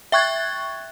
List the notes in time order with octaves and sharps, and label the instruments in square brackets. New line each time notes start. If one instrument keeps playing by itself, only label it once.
[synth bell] E5 G5 C#6 F#6 G#6 A6